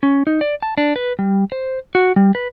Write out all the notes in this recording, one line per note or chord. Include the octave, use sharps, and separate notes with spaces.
C#4
D#4
D5
A5
D4
B4
G3
C5
F#4
G3
B4